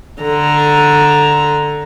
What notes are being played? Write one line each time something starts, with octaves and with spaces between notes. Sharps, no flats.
D3 A#5